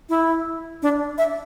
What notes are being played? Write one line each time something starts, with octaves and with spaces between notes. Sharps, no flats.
E4
D4
E5